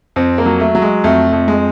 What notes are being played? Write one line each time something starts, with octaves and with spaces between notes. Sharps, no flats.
F2 C4
A#3
F#3
A3
F#3
G#3
F2 A3
F2
G#3